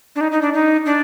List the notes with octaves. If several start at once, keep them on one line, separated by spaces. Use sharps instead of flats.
D4
D#4
D#4
D4
D#4
D4